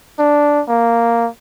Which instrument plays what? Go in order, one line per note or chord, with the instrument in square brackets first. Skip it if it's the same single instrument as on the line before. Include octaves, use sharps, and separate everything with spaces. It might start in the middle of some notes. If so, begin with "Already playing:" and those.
[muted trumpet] D4
A#3